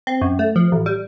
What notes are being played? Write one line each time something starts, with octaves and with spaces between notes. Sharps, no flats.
C4
F#2
A3
F3
A1
G3